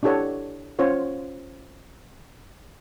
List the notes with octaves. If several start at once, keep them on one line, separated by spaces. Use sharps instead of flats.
D4 E4 G4 A4 C#5 F#5
C#4 F4 C5 C#5 F#5